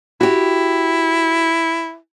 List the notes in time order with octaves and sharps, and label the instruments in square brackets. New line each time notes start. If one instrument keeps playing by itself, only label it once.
[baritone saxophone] E4 [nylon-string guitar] F#4 G4